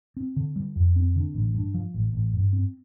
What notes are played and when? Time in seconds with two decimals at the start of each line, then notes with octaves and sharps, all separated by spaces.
0.17 C4
0.36 D3
0.56 G3
0.76 F2
0.96 C4
1.16 D3
1.34 A1
1.54 G2
1.74 F3
1.94 A1
2.13 A1
2.33 G2
2.53 C4